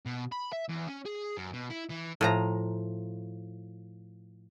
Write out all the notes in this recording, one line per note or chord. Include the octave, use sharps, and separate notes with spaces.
B2
B5
E5
E2
C#4
G#4
F#2
B2
E4
E3
A2 F3 A#5